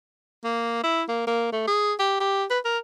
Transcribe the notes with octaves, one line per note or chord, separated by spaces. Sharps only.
A#3
E4
A#3
A#3
A3
G#4
G4
G4
B4
A#4